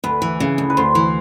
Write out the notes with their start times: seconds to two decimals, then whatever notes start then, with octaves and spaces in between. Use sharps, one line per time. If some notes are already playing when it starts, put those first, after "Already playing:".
0.04 D2 B4
0.22 E3
0.40 C#3
0.58 D2
0.70 B4
0.77 D2 C5
0.95 E3